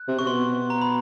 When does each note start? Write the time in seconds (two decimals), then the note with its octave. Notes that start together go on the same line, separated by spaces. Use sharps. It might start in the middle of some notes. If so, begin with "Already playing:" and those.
Already playing: F#6
0.08 C3
0.19 C3 C#6
0.26 B2 C6
0.70 A#5
0.82 B5